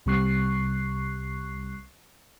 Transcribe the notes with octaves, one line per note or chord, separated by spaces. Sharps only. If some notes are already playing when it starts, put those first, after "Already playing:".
C2 C3 G3 C#6 F#6 C7